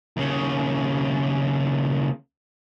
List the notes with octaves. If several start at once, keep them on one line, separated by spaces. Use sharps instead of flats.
D#2 C#3